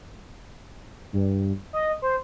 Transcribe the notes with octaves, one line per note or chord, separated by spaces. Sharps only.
G2
D#5
C5